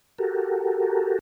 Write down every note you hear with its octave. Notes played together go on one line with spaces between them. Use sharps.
F#4 G4 A4 A#4